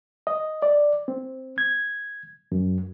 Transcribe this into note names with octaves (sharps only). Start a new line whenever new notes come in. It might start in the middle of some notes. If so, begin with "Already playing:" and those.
D#5
D5
C4
G#6
F#2